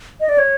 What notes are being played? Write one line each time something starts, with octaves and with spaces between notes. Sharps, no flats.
D#5
D5
C#5